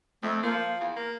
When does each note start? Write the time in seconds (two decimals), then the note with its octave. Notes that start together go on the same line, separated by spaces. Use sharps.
0.22 F2 A3
0.43 F3 A#3
0.59 F5
0.81 E2
0.96 A#3 A#4